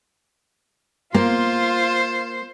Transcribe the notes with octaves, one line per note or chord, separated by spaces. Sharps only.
A#3 F4 C5